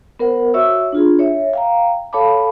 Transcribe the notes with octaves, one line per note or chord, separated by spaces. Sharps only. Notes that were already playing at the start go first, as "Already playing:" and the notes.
B3 A#4 C5 F#5
F#4 C#5 E5 C#6 E6
D4 F4 G#4
C#5 E5
F5 G5 A#5
A4 C#5 F5 A5 B5 D6